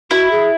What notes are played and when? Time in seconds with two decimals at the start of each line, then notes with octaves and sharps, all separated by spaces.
0.10 E4 F#4
0.31 G#4